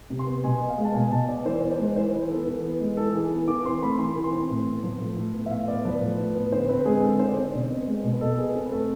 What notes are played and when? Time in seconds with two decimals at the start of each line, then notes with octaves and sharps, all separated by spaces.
0.10 C3
0.19 C6
0.27 B3
0.44 B2 G#5
0.62 B3
0.69 F5
0.78 G#3
0.85 A5
0.95 B2 G#5
1.11 B2 A5
1.28 B3 D5
1.45 E3 C5
1.62 B3 D5
1.71 C5
1.79 G#3
1.96 E3 C5
2.13 E3 B4
2.30 B3 A4
2.47 E3
2.63 B3
2.81 G#3
2.97 E3 A4
3.14 E3 G#4
3.31 B3
3.48 E3 D6
3.65 C4 C6
3.81 A3 B5
3.99 E3 C6
4.16 E3
4.24 C6
4.33 C4
4.50 A2
4.66 B3
4.83 F3
5.00 A2
5.17 A2
5.34 B3
5.46 E5
5.51 A2 F5
5.68 B3 D5
5.85 F3 B4
6.01 A2
6.18 A2
6.35 B3
6.52 D3 C5
6.69 C4 B4
6.85 G#3 G#4
7.03 D3 A4
7.20 D3 C5
7.28 D5
7.37 C4 C5
7.54 B2
7.71 B3
7.87 G#3
8.04 B2
8.13 B4
8.21 B2 A4
8.38 B3 G#4
8.55 C4 A4
8.66 B4
8.72 A3 A4